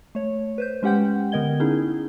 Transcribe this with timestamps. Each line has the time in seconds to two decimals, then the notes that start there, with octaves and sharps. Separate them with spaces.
0.15 A3 C#5
0.58 B4 C5 G6
0.83 G#3 C#4 G4 F#5 G5 G6
1.32 D3 B3 A#4 D#5 G#6 G7
1.60 C#4 D#4 E4 G#4